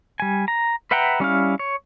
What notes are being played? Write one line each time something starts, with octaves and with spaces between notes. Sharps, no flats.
G3 G#5
A#5
B4 E5 F#5 G5 A#5
G3 C#4 E4 F5
C#5